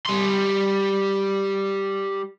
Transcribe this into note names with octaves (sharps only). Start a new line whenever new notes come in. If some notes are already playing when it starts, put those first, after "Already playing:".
G3 C6